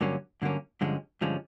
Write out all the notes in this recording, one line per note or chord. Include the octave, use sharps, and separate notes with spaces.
G2 D3 F#3 A#3 C#4
G2 D3 F#3 A#3 C#4
G2 D3 F3 G#3 C#4
G2 D3 F3 G#3 C#4